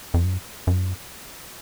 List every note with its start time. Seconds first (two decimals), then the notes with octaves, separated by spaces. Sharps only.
0.14 F2
0.24 F#2
0.67 F#2